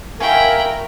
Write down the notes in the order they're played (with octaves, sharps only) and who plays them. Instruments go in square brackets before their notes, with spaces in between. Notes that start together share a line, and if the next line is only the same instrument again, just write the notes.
[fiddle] E4 G5 [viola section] A#4 [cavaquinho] F5 G#5 C#6